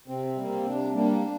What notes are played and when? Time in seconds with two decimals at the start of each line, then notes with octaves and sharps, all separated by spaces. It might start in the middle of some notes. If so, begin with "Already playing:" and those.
0.08 C3 C4
0.36 G3 A#3
0.65 C3 D4
0.94 G3 A#3 D4